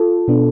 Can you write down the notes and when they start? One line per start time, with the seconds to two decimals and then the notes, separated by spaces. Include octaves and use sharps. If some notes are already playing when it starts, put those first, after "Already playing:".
Already playing: F4 A4
0.28 B2 B3 D4